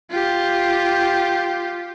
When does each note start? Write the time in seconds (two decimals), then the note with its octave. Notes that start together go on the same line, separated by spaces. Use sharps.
0.10 F4 G4